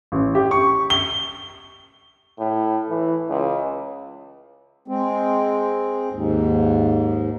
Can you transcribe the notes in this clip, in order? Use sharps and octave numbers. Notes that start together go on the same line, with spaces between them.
A1
G4
C#6
G7
A2
E3
C#2
G#3 C4
D#2 G#2